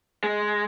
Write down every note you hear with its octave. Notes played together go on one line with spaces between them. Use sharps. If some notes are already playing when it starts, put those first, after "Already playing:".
G#3